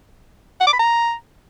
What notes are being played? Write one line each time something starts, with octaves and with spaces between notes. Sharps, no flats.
F#5
D6
B5
A#5